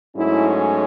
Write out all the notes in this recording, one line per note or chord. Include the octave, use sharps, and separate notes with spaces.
G#2 F#3 A3 C#4 E4